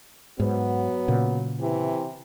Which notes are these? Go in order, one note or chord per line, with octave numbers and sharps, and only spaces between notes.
G#2 F#3 B3
A#2 C#3
C3 E3